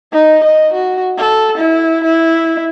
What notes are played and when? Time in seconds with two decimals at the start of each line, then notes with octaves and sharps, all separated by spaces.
0.13 D#4
0.44 D#5
0.73 F#4
1.18 A4
1.57 E4
2.03 E4